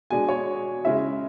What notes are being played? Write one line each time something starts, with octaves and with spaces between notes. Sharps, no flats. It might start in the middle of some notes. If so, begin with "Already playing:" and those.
B2 G#3 D4 G#5
C#5
C#3 G#3 C#4 E4 E5